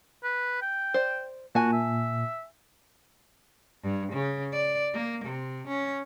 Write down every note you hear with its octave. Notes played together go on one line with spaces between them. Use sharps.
B4
G5
C5 D5
A#2 F#4 G#5 A5
E5
G2
C#3
D5
A#3
C3
C#4